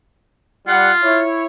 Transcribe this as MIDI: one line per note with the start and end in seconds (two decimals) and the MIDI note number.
0.67 0.90 55
0.67 1.20 65
0.67 0.90 78
1.03 1.46 64
1.03 1.46 73